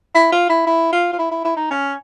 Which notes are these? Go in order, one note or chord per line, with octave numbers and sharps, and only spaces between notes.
E4
F4
E4
E4
F4
F4
E4
E4
E4
D#4
C#4